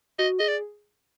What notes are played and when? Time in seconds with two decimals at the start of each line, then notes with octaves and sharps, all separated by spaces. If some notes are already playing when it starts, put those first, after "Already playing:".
0.19 F#4 D#5
0.39 G#4 D#5
0.47 D5